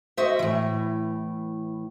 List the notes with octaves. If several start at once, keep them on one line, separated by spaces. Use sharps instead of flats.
F#4 C5 D#5 E5
A2 E3